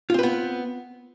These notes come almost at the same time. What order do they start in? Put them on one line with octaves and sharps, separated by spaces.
F4 C4 B4 B3